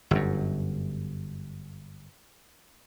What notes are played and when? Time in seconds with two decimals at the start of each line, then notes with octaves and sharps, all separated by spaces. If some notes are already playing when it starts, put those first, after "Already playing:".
0.11 G1 F#2